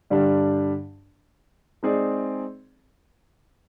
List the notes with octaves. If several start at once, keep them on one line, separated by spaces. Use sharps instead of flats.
G2 D3 G3 D4 G4
G#3 C4 D#4 G#4 D5